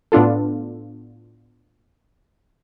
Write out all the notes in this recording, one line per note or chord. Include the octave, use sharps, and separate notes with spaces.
A2 B3 D4 F4 A4